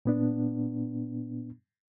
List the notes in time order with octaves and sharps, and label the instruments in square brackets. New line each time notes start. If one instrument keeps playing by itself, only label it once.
[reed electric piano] A#2 B3 D4